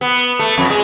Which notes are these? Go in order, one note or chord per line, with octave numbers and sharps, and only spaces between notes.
B3
A3
F2
G#3